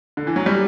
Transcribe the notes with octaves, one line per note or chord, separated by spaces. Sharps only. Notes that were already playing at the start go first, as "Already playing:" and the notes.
D3
E3
F#3
G3